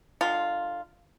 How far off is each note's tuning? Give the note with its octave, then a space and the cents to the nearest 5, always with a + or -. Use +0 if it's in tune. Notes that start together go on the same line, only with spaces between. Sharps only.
D3 +40 G#3 +0 F4 +0